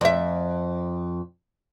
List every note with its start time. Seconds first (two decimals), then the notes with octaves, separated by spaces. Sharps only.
0.01 F2 E5